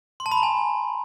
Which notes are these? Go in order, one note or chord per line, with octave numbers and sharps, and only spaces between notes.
C6
A5
B5
A#5
G#5